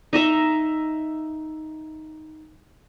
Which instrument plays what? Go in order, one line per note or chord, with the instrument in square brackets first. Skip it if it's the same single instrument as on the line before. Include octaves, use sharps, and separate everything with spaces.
[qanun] D#4 D#5 E5 A#5